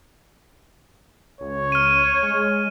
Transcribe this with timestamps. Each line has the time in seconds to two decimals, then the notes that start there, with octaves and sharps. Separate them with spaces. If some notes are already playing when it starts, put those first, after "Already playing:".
1.41 C#2 C#5
1.72 F6 D#7
2.23 G#3